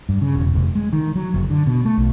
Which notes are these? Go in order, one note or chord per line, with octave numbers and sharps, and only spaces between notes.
G2
C#3
E1
F1
G#3
D#3
F#3
F#1
D3
B2
A3
B1